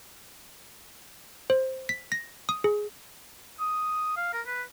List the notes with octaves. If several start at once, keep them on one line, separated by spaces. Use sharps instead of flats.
C5
B6
A#6
D#6
G#4
D#6
F5
A#4
B4